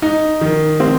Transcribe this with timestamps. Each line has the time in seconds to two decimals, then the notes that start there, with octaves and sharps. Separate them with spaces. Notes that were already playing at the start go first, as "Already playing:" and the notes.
0.02 D#4
0.41 D#3
0.80 C4